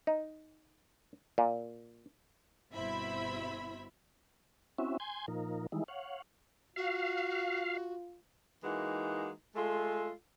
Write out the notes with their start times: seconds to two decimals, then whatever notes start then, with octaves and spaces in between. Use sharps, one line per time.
0.07 D#4
1.38 A#2
2.73 G1 B2 C4 E4 E5 B5
4.78 C4 C#4 E4 F#4 E5
5.00 G#5 C6 G6 G#6
5.28 A#2 F3 D#4 A#4
5.72 D#3 E3 G3 G#3 D#4 E4
5.88 C#5 F5 F#5
6.76 F4 F#4 F5
8.64 E3 G#3 A#3 D#4 F#4
9.56 G#3 A3 F4 A4